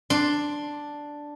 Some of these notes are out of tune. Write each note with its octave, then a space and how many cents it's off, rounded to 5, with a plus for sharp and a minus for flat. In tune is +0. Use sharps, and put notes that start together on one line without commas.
D4 +0 C6 +0